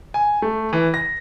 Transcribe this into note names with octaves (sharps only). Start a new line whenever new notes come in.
G#5
A3
E3
A#6